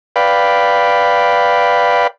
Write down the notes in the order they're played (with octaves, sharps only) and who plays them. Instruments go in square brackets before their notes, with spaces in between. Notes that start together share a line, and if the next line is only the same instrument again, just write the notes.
[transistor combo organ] B4 D5 F5 G5 B5